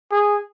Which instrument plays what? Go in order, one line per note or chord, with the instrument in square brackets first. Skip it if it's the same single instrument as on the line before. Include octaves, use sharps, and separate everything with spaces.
[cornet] G#4